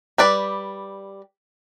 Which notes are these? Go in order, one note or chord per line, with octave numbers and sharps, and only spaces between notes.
G3 B4 D5